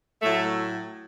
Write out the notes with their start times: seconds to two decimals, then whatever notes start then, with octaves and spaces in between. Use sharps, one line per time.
0.22 A2 F#3 A3